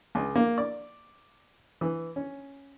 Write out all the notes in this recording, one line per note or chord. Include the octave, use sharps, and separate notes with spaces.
C#2
A#3
D5
E3
C#4